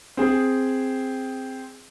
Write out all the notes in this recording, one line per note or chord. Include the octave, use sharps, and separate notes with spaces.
C4 G#4